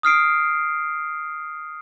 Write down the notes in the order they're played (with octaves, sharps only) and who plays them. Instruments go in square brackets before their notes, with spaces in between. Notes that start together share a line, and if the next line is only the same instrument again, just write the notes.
[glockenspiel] D#6 F6 C7 D7